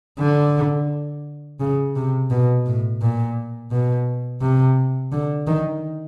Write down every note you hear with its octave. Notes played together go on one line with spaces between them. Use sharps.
D3
C#3
C3
B2
A2
A#2
B2
C3
D3
D#3